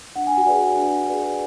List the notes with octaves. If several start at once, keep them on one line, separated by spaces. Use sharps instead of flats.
D4 F#5
G#5
F#4 F#5
G#4 B4 D5
D4
G#4 B4 D5